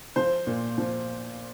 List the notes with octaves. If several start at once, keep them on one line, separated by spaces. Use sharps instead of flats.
F3 C5
A#2
F3